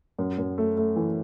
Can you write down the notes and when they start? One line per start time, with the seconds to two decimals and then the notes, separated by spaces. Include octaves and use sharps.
0.19 F#2
0.38 F#2
0.58 A3
0.77 A3
0.96 E3